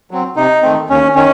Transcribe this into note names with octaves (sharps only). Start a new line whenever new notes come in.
F#3 C4
C3 D#4
D#3 A3 C4
D#2 C#4
D#3 C#4